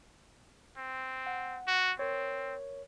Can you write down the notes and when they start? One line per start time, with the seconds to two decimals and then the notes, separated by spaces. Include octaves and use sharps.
0.77 C4
1.27 F#5
1.67 F#4
1.99 C4 A#4 C#5